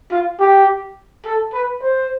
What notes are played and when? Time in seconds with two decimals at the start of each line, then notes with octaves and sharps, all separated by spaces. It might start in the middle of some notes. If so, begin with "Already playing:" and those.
0.11 F4
0.39 G4
1.25 A4
1.53 B4
1.81 C5